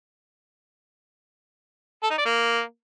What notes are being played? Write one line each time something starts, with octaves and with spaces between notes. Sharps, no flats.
A4
D#4
D5
A#3